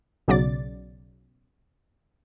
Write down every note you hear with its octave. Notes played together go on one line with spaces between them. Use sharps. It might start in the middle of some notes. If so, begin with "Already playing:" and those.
B1 C#3 F#3 D5 A6